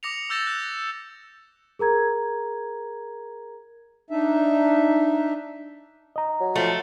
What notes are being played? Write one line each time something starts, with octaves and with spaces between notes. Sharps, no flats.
D6 D#6 A#6 C#7 F7
D6 E6 G6 A6 A#6 E7
F#6
G#4 A#4 A#5 G#6
D4 D#4 E5
D#5 A#5
F#3
F3 A3